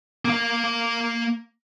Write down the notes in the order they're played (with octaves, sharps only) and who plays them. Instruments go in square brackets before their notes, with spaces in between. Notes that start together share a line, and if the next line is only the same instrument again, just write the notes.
[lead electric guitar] A#3 F5